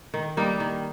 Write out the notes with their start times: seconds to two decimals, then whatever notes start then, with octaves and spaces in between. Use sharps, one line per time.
0.14 D#3
0.37 G3 A#3 D#4
0.60 D#3